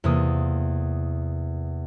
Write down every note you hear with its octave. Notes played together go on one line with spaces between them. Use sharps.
E2 C3 A#3 D#6